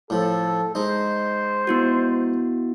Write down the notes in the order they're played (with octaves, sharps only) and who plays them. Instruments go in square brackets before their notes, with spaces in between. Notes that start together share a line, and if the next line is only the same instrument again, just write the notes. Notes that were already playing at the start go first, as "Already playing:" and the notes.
[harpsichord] A2 F3 [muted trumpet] A4
[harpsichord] G#3 D#4 [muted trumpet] C5
[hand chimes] B3 E4 F#4